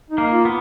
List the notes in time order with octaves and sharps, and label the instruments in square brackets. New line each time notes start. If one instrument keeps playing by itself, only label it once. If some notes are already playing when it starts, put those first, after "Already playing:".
[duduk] D#4
[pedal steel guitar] A#3
[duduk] F4
[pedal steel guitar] B3